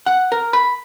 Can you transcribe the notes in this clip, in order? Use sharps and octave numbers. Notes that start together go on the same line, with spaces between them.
F#5
A#4
B5